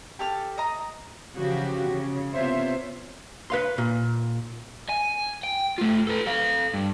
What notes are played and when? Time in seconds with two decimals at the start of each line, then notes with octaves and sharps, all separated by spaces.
0.19 G4 A4 F6
0.58 D#5 A#5
1.36 C#3 E3 F3 F#4 G4
1.91 C#3
2.34 C3 B3 F4 C5 C#5 E5
3.50 B4 F5 C6
3.78 A#2
4.89 G#5
5.43 G5
5.78 A3 F4
6.07 A4 B4
6.26 A4 F5
6.74 G2